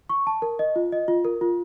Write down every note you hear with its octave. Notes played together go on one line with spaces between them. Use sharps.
C#6
A5
A#4
D#5
F4
D#5
F4
A#4
F4